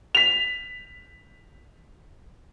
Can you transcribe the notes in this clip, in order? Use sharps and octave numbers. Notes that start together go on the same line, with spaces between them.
B6 F7